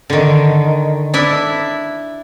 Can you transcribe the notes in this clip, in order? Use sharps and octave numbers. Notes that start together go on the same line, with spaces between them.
D3 D#3
D4 E4 E5